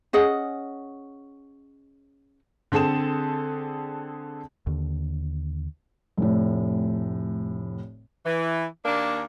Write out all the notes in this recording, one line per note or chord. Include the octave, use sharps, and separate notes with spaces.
C#4 G#4 D#5 F#5
D3 C4 G#4 A4 E7
D#2 D3
F1 A2
E3
D#2 A#3 D4